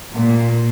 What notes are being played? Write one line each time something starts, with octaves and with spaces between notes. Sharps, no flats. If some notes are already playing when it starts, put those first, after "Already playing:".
A#2